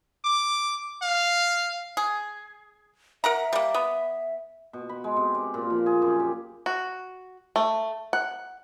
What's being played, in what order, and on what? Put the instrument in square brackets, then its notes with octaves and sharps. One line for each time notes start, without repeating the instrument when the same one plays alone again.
[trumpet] D6
F5
[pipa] G#4
[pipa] A#4 F#5 A#5 [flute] E5
[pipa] G3 A#3
B3
[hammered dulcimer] B2
B5
G#3
C3
D5
A#2
F3
G#4
F#2
G4
[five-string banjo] F#4
A3
F#5